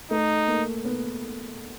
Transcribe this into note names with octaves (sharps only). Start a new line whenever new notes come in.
A3 D#4
A#3
B3